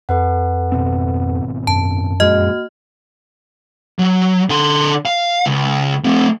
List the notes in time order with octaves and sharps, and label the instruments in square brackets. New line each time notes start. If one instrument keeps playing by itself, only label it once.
[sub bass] F2 [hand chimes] A4 B4 F#5
[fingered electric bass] G#1 B2 C4
[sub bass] F#2 [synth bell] A5
[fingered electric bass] F2 A#2 G#3 [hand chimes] A#3 F#4 F6 [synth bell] D#5
[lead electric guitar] F#3
D3 C6
F5
C#2
A3 C4